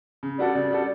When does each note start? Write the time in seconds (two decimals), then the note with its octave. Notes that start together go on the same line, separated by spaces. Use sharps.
0.23 C#3
0.38 G3 D4 F#4 A4 D5
0.55 C#3
0.71 G3 D4 F#4 A4